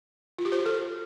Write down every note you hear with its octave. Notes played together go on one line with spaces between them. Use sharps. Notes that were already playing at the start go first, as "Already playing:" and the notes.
F4
G4
C5
F#4
A4